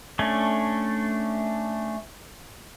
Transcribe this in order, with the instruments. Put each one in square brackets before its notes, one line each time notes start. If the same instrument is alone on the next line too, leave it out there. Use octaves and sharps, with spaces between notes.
[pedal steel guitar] A3 C#4 D4